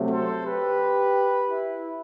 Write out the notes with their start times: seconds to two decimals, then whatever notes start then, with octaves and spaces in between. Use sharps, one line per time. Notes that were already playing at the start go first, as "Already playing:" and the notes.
Already playing: C3 F#3 A3 C4
0.09 A4 C5
0.44 G4 B4
1.50 E4